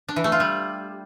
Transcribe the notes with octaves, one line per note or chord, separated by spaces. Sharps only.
D4
E3
A3
F4
G3